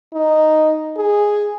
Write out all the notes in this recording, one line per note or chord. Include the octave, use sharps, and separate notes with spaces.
D#4
G#4